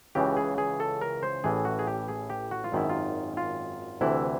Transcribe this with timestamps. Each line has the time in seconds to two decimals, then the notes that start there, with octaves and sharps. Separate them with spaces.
0.15 C#2 C#3 E3 G4
0.37 G#4
0.58 G#4
0.80 A4
1.01 A#4
1.23 C5
1.44 A1 A2 E3 G#4
1.65 F#4
1.79 G#4
1.87 G4
2.08 G#4
2.30 G4
2.51 F#4
2.64 F4
2.72 G#1 F#2 D#3 E4
2.90 F4
3.37 F4
4.01 D2 C3 E3 E4